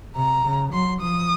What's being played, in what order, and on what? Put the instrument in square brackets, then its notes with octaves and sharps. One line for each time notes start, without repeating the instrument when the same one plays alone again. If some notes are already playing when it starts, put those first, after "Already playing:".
[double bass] C3 [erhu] A#5
[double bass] C#3
[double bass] F#3 [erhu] C6
[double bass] F3 [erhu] D#6